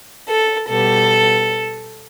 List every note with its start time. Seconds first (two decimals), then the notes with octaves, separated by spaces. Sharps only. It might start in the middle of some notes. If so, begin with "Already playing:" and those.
0.29 A4
0.69 B2 G3 B3 A4